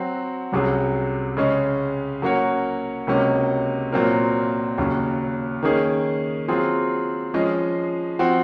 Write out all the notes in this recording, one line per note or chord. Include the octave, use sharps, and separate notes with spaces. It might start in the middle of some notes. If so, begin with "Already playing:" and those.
Already playing: F#3 C4 F#4
C2 C3 F#3 C#4 G#4
C#3 G#3 C#4
F#3 A#3 C#4 F#4 C#5
C#2 C3 F#3 A#3 C#4
A#2 F#3 C4 F4 A#4
D#2 C#3 F#3 C#4
D#3 A#3 C#4 G#4
F#3 C4 F4 G#4
F3 G#3 C#4 G#4 D#5
F3 C4 F#4